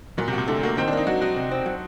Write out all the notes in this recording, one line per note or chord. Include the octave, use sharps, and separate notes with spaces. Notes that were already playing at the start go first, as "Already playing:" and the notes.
A#2 F#3
C3
F#4
C3
D3 A3
A#3 F#4
D#3 C4
D4
A#3 D#4
F#3 F#4
D#4 F#4
C3
C4
F#3